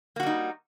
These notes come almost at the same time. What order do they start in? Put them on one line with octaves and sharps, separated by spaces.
A#3 F#4 G3 D#4